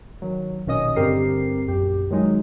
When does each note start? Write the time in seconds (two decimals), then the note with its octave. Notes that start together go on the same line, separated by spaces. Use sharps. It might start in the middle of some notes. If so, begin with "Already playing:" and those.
0.22 D#3 F#3
0.66 A#1 B2 D#3 C#4 D#5 D#6
0.96 G2 D3 C4 G4 A#4 C7
1.67 A#1 F#2 G4
2.10 D#3 F#3 G#3 D#4